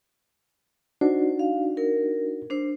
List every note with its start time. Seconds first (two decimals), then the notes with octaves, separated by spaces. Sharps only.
1.01 D4 D#4 F#4 C5
1.39 F5
1.77 A#4
2.50 D4 C5